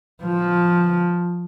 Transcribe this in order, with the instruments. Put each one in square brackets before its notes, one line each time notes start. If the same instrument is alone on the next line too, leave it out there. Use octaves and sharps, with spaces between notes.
[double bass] F3